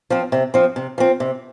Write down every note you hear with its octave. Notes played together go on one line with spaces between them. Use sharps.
F3 C4
C3
F3 C4
C3
F3 C4
C3